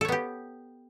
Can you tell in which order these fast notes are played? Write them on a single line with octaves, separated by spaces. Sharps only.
A4 C#5 B3 G4